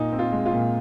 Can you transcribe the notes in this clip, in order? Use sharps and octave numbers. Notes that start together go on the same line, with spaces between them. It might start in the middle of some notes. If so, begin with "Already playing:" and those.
Already playing: A#2 D#4
C4
F4
G#3
F4
A#2